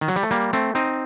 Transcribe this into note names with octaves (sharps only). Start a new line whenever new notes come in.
D#3
F#3
G3
A3
G3 A#3
A3 C4
C4 D#4